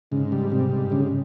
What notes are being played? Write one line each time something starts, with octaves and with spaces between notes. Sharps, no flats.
G#2 C#3
G3
C3 G3
G#2
G#2 C#3